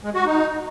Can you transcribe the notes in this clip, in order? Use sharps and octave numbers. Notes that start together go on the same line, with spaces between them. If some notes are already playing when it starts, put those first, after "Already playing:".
G#3
F#4
D#4